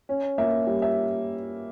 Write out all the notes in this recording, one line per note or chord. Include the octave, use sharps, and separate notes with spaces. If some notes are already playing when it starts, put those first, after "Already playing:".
C#4
A#3 E5
G3
E5